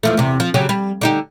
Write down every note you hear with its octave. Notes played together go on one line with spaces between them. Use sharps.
E2 F3 A3
E2 C3
F3
C#3 F#3 G4
G3
D3 D#4 G4